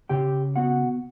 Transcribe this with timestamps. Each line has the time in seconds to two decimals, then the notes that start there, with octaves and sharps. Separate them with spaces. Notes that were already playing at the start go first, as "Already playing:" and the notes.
0.09 C#3 G4 G5
0.56 B3 F#4 F#5